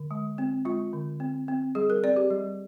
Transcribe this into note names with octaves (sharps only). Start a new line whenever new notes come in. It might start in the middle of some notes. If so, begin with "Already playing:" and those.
Already playing: D3
G#3
C4
G#3 F4
D3
C4
C4
G3 G#4
A#4
C4 D5
G4
G3